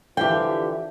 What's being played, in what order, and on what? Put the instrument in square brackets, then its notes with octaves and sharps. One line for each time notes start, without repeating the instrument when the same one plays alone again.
[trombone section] D3 E3 F3 [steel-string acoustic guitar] G4 E5 F5 [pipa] G5